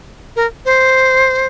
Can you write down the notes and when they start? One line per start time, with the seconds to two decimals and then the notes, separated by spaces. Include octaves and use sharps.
0.36 A#4
0.65 C5